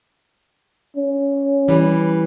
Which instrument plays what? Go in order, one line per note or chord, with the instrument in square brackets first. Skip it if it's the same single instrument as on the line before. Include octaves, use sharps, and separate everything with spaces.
[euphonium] C#4
[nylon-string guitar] E3 G3